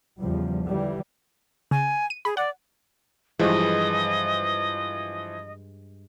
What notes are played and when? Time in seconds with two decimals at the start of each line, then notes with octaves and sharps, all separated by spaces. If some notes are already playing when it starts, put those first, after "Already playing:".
0.19 E2 C#3 F3 G3
0.65 D3 E3 G3
1.71 C#3 G#5
2.10 D#7
2.25 G#4 B5
2.37 D5 F#5
3.39 G2 E3 F3 G#3 D#5